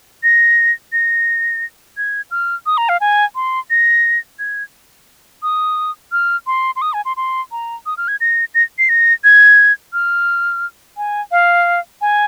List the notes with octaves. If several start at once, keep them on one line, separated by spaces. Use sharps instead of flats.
A#6
A#6
G#6
F6
D#6
A#5
F5
G#5
C6
A#6
G#6
D#6
F6
C6
C6
D#6
G#5
C6
C6
A#5
D#6
F6
G#6
A#6
A#6
C7
A#6
G#6
F6
G#5
F5
G#5